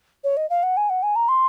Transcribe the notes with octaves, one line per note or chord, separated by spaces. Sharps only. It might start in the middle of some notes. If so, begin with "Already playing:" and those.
C#5
D#5
F5
F#5
G#5
F#5
G#5
A#5
C6